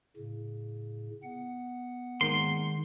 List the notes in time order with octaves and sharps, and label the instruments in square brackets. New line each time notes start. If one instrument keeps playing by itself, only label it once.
[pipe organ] A2 C#3
B3 F#5
[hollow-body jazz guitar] D#3 G#3 A#3 [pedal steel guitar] C6